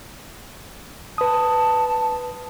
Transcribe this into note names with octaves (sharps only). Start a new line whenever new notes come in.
B4 A5 D#6